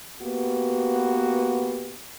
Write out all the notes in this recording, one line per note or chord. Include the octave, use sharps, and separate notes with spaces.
A#3 B3 F#4 G4 B4